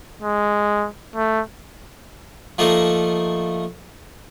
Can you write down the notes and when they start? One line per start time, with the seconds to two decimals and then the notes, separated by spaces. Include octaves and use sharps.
0.22 G#3
1.15 A3
2.58 F3 A3 A#3 D#4